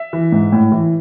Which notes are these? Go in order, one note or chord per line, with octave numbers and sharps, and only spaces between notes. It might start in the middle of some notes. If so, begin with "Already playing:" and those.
Already playing: E5
E3
G#2
A2
E3